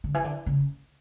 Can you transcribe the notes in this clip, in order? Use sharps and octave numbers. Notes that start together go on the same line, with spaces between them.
D3
E3
D3
C#3